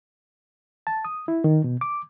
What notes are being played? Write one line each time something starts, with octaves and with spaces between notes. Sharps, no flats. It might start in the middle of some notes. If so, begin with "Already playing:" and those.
A5
D#6
E4
D#3
B2
D6